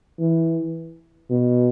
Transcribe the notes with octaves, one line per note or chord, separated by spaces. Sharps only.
E3
B2